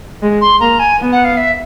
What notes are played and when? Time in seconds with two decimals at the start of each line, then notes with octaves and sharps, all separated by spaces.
0.22 G#3
0.41 C6
0.60 A#3 A#5
0.79 G#5
0.99 B3
1.12 F#5
1.25 F5
1.37 E5